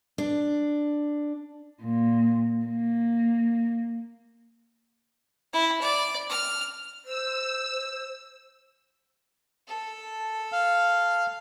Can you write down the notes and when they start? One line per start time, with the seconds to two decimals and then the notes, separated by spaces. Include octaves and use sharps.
0.18 D4
1.81 A#2
2.65 A#3
5.53 E4
5.81 D5
6.29 F6
7.05 C5 E6
9.68 A4
10.52 F5